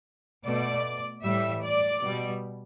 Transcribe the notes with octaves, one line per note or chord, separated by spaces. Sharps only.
B2 A3 D5
A2 E3 G3 E5
D5
B2 G3